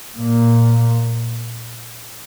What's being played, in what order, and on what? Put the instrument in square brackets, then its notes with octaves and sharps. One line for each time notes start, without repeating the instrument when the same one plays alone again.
[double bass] A#2